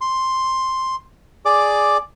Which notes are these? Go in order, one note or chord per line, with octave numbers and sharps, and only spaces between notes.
C6
G#4 D5 D6